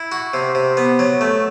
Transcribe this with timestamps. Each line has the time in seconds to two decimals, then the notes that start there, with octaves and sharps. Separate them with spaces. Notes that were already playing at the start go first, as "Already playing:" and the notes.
Already playing: E4
0.12 F#4
0.34 C3
0.55 C3
0.77 B3
0.99 F#3
1.21 A3